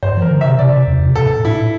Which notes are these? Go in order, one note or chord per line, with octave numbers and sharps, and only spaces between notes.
G2 C5
E3
A#4
E3
D3
C3 E5
C3 D5
C3
E2
C3
A#2 A4
A#2
A2 E4